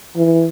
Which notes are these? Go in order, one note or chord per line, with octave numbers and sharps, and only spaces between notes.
E3